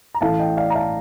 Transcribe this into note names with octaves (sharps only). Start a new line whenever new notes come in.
A#5
A1 A2 A3 F5 A5
D#5 G5
D5 F5
A#5
F5 A5